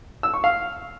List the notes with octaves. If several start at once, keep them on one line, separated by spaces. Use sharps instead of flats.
E6
C#6
F5